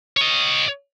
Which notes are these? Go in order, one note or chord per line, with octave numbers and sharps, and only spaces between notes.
C#5 D#5